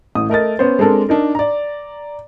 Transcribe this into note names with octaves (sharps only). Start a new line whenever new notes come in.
A1 A2 D#6
A3 A#4 D#5 A6
B3 C#4 C5
G#3 C4 D4 A4 A#4
D4 D#4 A#4
D5 A#5